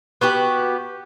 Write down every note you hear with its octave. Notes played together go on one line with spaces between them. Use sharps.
B3 F#4 G4